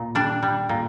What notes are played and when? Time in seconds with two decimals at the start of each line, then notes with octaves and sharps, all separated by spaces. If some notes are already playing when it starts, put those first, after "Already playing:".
Already playing: A#2
0.15 G3 D4
0.43 G3
0.69 A#2